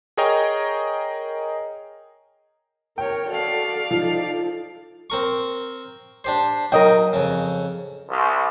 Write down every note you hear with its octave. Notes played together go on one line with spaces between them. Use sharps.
G#4 A#4 C#5 D#5 G5 A#5
A#4 C#5 G5
F#4 A4 D5 F5
F3 D#4 A4
C4 A#4 C#6
D4 G4 C5
F#3 D#4 A#4 D#5 G5
F2 C#3
C2